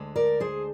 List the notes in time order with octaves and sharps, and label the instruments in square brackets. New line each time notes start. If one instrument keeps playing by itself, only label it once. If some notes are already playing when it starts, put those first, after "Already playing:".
Already playing: [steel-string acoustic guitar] D2 D3 G#3 D4
A#4 D5
G#4 C5